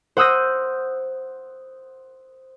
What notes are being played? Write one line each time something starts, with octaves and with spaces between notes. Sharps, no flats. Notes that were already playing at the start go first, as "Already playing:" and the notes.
C5 F#5 D#6 E6 G6 A#6